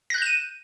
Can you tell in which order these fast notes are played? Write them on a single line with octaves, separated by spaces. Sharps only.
A#6 F#6 G6 E7 D#7